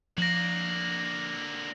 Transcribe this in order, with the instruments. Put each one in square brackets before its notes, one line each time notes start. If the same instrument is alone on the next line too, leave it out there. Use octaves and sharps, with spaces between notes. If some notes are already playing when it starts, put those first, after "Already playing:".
[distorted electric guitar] D3 A#3 [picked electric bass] F3 [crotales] A#6 F#7